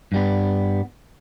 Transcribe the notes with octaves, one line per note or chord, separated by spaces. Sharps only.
G2 G3 B3